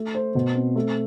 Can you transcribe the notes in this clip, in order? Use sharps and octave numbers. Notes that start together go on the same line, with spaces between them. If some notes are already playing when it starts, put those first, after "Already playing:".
Already playing: A3
C5
B2
C4
A3